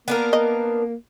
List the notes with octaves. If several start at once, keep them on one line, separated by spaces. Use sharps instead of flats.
A#3 B3 D4 A#4
D#5